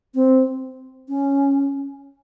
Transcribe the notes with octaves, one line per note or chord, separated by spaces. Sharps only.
C4
C#4